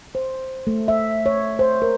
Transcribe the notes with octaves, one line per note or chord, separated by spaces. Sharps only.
C5
A3
E5
C#5
C5
A#4